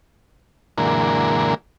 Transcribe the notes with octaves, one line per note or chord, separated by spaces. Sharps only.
F#2 A#2 D3 E3 G#3 A#3